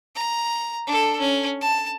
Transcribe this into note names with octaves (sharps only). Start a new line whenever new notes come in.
A#5
D4 A4
C#4
A5